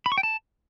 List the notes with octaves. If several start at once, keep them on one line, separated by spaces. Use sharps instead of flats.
B5
C#6
G5
A5